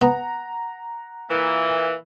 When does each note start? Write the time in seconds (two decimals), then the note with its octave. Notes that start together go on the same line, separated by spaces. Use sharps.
0.01 B3 F#5 A#5
1.29 A#2 E3